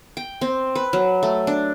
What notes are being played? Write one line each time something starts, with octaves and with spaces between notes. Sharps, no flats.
G5
C4
B4
F#3
A3
D4